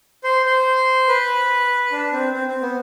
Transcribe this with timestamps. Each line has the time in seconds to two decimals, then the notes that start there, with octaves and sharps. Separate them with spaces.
0.24 C5
0.46 C5
1.08 B4
1.92 D4
2.13 C4
2.34 C4
2.48 C4
2.62 B3